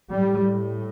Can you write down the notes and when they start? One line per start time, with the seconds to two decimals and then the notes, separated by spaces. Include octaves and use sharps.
0.11 A2 G3